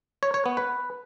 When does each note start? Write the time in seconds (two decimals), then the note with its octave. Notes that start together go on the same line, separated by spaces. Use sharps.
0.23 C#5
0.34 C#5
0.46 B3
0.57 B4